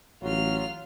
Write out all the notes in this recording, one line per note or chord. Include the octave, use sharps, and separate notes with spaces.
A1 F#3 F4 F6